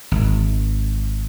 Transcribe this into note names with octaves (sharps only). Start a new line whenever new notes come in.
G#1